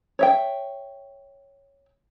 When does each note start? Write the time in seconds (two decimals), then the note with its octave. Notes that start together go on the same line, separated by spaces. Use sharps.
0.19 C#5 E5 G5